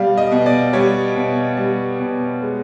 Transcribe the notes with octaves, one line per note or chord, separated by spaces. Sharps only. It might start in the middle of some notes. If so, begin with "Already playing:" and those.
Already playing: B2 G3 F5
D#5
B2
D5
G3 C#5
B2
G3
B2
G#3